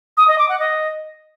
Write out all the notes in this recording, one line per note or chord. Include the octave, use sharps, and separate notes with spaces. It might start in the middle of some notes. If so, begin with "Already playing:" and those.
D#6
D#5
D6
F#5
D#5